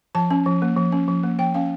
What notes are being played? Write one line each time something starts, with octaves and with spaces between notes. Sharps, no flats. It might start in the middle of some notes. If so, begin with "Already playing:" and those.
F3 A5
C#4
F3
A#3
F3
C#4
F3
A#3
F3 G5
C#4 F5